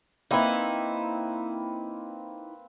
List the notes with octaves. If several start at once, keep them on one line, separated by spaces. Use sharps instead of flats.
A#3 C4 D#4 E4 B4